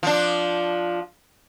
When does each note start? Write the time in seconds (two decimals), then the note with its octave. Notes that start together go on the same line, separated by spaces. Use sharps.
0.03 F3 D4